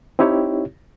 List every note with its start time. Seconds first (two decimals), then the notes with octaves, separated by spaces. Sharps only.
0.19 C4 D#4 E4 G4 C#5